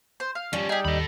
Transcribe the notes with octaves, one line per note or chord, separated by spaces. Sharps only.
C5
F5
F3 G3 C#4
D#4 G4 G#4
D#2 A4 B5